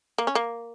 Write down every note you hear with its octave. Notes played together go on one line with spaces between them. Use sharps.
A#3
C#4
A#3